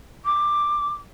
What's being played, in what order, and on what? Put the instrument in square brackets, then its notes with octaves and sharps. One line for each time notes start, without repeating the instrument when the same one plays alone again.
[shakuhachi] D6